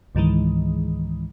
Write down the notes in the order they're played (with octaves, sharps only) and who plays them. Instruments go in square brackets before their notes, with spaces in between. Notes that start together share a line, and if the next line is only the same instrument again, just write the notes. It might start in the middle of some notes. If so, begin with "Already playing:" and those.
[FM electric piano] C#2 G#2 D#3 E3 G#3